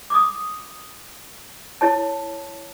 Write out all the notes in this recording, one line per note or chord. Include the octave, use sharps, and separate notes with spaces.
D6 D#6
E4 C#5 A5